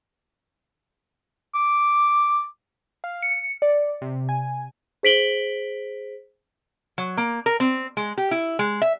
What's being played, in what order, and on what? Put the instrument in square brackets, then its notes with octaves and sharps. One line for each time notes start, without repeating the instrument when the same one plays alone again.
[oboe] D6
[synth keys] F5
C#7
D5
C3
G#5
[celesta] G#4 C5 B6 D7 F#7 G7
[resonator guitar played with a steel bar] F#3
A#3
A#4
C4
G#3
G4
E4
G#3
E5